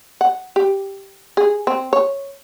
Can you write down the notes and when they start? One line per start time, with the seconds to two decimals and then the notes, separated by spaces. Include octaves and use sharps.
0.21 F#5
0.56 G4
1.37 G#4
1.67 C4
1.93 C#5